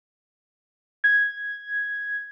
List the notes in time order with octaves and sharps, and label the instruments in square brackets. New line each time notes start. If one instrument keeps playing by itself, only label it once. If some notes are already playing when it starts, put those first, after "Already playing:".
[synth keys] G#6